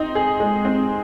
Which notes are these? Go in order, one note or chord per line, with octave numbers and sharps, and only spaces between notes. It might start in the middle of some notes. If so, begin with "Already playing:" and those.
Already playing: C4 D#4
G#4
G#3
C4